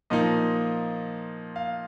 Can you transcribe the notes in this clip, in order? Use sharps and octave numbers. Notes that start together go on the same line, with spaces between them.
A#2 F3 A#3 D#4 D#5
F5